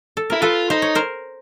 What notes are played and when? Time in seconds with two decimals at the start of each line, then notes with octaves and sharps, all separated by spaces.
0.17 A4
0.30 E4 A#4
0.42 F4 A4 B4
0.70 D#4 C5
0.82 C#5
0.95 A#4 C5